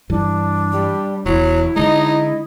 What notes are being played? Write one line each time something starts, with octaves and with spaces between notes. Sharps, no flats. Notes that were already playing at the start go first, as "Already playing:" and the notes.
G2 E3 D4
G3
E1 E2 F#3 E4
D3 G#3 D#4 D#5